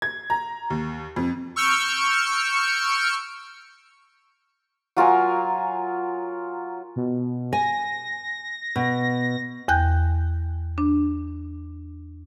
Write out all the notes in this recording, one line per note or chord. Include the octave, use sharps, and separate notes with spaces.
G#6
A#5
D#2
F2
C#6 E6 F6 G6 C#7 D7
F#3 F4 A#4 G#5
B2
G#5 A#6
B2
E2 G5 F#6 G6
D4